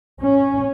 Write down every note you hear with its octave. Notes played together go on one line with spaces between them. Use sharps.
C#4